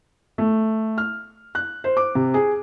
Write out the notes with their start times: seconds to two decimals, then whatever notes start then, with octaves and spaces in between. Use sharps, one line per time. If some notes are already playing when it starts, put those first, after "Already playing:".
0.38 A3
0.98 F6
1.55 F#6
1.84 C5
1.97 D6
2.15 C3
2.34 G#4